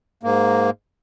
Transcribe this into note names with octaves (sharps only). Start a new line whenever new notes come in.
G#2 A#3